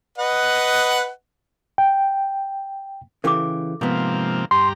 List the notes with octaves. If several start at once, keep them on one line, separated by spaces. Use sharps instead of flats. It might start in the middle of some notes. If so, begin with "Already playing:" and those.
B4 D#5 F#5
G5
C#3 E3 G4 A4 D6
G#2 C3 F3 A#3 B3
G2 G4 A#5 C6